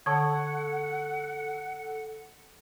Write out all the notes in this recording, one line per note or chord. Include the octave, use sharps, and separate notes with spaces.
D3 A4 C#5 F#5 A5 C#6 E6 G#6